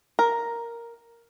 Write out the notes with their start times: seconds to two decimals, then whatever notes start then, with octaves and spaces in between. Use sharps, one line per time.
0.19 A#4